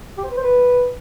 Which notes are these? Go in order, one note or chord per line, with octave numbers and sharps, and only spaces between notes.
G4
C5
B4
C5
B4